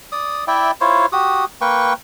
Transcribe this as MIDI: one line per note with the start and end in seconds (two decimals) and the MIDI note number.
0.12 0.44 74
0.12 0.44 87
0.48 0.71 64
0.48 0.71 74
0.48 0.71 76
0.48 0.71 79
0.81 1.06 64
0.81 1.06 65
0.81 1.06 72
0.81 1.06 73
1.12 1.45 66
1.12 1.45 67
1.12 1.45 87
1.61 1.93 58
1.61 1.93 71
1.61 1.93 79
1.61 1.93 85